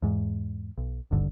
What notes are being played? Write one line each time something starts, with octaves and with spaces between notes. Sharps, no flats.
E2 G#2
B1
D#1 G#1 G2 D3